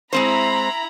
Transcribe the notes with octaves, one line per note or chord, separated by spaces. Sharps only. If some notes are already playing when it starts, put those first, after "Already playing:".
G#3 C4 E4 C5 A#5 B5